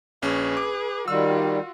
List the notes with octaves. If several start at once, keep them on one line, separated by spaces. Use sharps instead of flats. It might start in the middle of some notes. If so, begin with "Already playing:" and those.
A#1 C#4 G#4 B4
D6
D#3 G3 F4 F#4 E6